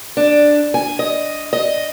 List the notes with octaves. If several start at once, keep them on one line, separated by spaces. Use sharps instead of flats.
D4
G#5
D#5
D#5